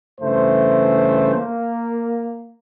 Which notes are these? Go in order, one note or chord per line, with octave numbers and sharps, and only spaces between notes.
G2 C#3 E3 A3 C5
A#3